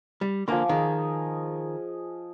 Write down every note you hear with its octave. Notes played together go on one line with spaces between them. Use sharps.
G3
D3 F3 A#3 G#5 D6
D#3 G#4 D#5